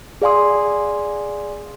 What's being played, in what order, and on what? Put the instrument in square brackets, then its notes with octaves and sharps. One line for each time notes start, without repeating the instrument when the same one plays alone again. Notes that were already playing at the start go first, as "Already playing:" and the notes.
[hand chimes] G#4 D5 F5 G#5 C6 D#6